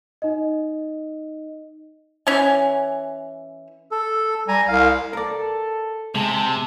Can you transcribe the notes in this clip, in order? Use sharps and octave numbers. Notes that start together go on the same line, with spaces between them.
D#4 D#5
E3 C#4 G#5
A4
G3 G#5 A#5
C2 F5
A4 A#4 D5
C3 G#3 A5